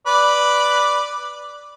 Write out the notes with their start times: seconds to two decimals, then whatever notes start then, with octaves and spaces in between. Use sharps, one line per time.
0.07 B4 D5